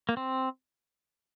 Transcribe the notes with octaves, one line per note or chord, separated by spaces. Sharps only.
A#3
C4